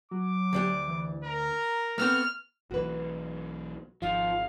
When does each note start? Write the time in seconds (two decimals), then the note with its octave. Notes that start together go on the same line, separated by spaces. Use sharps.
0.11 F#3 D6
0.53 D2 D4 G4
0.88 E3
1.25 A#4 A#5
1.98 A3 B3 C4 F6
2.71 B1 E3 F#4 B4
4.02 G#1 F3 F5